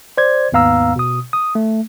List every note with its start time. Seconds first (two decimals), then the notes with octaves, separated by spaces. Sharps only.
0.18 C5 D5 G#6
0.52 D#2 G#2 B3 F5 A#5 E6
0.96 B2 D#6
1.33 D#6
1.55 A3